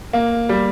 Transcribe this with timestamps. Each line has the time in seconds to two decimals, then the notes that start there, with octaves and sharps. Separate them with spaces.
0.13 A#3
0.49 G3